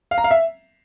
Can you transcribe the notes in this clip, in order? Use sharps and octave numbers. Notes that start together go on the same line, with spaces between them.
F5
A#5
F5
E5